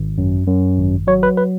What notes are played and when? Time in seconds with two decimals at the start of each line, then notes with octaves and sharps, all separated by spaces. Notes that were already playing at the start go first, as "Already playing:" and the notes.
Already playing: G#1
0.18 F#2
0.47 F#2
0.78 G#1
1.07 F#3 C#5
1.23 B4
1.37 B4